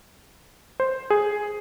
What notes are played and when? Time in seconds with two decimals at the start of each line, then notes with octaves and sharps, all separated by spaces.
0.80 C5
1.10 G#4